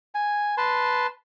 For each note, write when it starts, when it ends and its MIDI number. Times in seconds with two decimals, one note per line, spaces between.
0.15 0.55 80
0.58 1.07 71
0.58 1.07 81
0.58 1.07 84